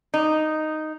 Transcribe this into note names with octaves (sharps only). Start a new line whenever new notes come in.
D#4